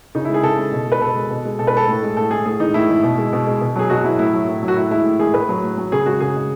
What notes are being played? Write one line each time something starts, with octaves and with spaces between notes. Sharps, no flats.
C#3 D#4
E4
G#3 G#4
C#3 A4
G#3
B2
G#3 B4
B2 A4
G#3
B2
G#3
B2 A4
B4
G#3 A4
A2
G#3
A2 A4
G#3 G#4
A2 G#4
E3 G#3 D#4
A2 E4
E3 G#3
B2
G#3
B2
G#3
B2
F#3 G#4
B2 F#4
F#3 E4
A2 E4
F#3
A2
F#3
F#4
A2 E4
E3 G#3 E4
A2
E3 G#3 G#4
A2 B4
F#3
A2
F#3
C#3 G#4
G#3 F#4
C#3 G#4
G#3